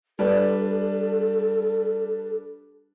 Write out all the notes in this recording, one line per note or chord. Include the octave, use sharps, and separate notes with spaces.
G3 D4 A4 B4